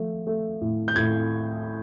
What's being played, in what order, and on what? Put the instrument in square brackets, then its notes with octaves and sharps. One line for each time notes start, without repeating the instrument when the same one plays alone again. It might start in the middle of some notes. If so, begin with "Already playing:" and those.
Already playing: [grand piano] F3 A3
A3
A2
G6
A2 G#6